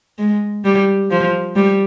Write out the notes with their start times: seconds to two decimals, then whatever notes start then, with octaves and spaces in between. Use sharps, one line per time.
0.18 G#3
0.65 G3
1.11 F3
1.56 G3